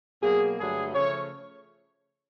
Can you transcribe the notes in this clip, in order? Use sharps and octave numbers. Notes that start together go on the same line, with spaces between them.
B2 F#3 A#3 G#4
G2 D3 F#3 A3 G#4
C#3 F3 A3 C#5